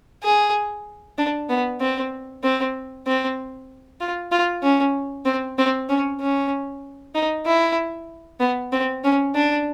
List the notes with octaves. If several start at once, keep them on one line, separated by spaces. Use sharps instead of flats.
G#4
D4
B3
C4
C4
C4
F4
F4
C#4
C4
C4
C#4
C#4
D#4
E4
B3
C4
C#4
D4